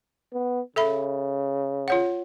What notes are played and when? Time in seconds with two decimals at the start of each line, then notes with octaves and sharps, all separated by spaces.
0.33 B3
0.76 C#3 A4 E5 B5
1.88 F4 C#5 F#5